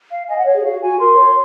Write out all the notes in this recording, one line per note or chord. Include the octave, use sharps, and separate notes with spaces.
F5
D#5 G#5
F#5
C#5
G#4
F#4 F5
F#4 G#5
A#4 C6
C#5